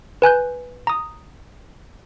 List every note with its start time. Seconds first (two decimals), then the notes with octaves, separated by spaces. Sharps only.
0.22 B4 G#5 F#6 G6
0.87 A#5 D#6